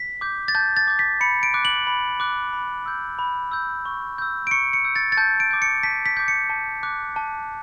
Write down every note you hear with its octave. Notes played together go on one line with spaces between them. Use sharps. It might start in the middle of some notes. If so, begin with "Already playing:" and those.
Already playing: B6
D6 G6
A6
A5 G6
A6
D6 G6
B6
B5 C#7
D7
D6 F#6
F#7
B5
D6 F#6
B5
E6 G6
B5
E6 G6
C#6
E6 G6
D7
C#6 C#7
C#7
E6 G6
A6
A6
A5 G6
D7
D6 G6
C#7
A5 B6
B6
D6 G6
C#7
A5
D6 F#6
A5